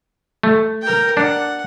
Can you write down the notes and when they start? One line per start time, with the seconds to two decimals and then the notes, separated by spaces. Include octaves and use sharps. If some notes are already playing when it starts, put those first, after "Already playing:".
0.43 A3
0.82 A#4 G5
1.17 D4 F#5